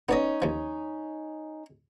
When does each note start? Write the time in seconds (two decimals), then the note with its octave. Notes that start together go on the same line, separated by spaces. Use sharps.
0.09 B3 C#4 D#4 D5 D#5
0.42 D#2 F3